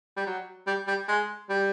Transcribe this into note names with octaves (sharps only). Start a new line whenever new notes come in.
G3
F#3
G3
G3
G#3
G3